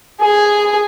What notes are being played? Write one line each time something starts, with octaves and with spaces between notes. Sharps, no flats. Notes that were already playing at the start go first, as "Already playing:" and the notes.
G#4